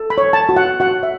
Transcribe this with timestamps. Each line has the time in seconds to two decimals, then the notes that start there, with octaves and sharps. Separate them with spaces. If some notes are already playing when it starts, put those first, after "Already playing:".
Already playing: A4
0.10 B5
0.18 C#5
0.33 A5
0.49 F#4
0.57 F#5
0.80 F#4 F#5
1.03 E5